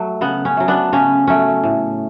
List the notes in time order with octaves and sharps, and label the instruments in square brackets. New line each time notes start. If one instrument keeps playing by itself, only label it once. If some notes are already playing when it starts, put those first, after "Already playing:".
Already playing: [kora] F#3 A3
C#3 B3
C#4
F#3 A3
B3 D4
C#3 C#4
F#3 A3 C#4
A2